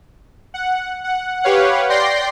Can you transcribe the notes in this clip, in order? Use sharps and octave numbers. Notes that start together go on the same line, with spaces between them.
F#5
F#5
G4 B4 C#5 F5 F#5
D5 G5 C6 G6 A#6 C7